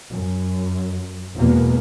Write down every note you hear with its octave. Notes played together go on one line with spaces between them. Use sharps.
F#2
E2 B2 G#3 A#3 B3